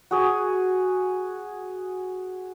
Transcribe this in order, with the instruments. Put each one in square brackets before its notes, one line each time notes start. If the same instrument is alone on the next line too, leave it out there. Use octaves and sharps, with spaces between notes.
[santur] F#4 G#4 G#5